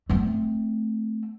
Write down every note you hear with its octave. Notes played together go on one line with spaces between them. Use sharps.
A3 C4